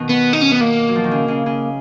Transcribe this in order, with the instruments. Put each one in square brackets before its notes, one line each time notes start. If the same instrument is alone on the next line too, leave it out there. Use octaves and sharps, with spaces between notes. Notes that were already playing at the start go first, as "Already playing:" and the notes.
Already playing: [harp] B2 D#3
[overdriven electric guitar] B3
D#4
C#4
B3
A#3
[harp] F#3
F3
D#3
C#3
C#3
C#3